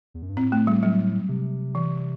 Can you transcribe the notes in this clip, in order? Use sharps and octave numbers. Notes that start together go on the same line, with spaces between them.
E2
F#2
G2
A2 C4
A3
G3
F#3
C3
E3